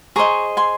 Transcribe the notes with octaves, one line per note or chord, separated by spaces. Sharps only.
G#4 C5 D#5 A#5 C#6
G#5 C6